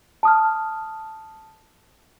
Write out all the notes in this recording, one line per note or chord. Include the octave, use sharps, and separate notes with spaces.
A5 D#6 F6